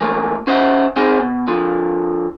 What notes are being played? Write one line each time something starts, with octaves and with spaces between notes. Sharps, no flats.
E3 A3 A#3
C#4 C5 D#5 E5 F#5
C4 D#4 F#4 G#4
B2
D3 F3